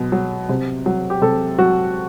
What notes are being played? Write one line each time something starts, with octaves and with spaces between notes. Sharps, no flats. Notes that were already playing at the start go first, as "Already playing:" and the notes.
Already playing: B2 F#3
F#3
C3
F#3
G4
C3 A4
F#3 F#4